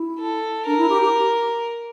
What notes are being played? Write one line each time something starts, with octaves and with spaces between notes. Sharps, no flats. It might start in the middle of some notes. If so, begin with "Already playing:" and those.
Already playing: E4
A4
D4 A#4
E4
G4
G4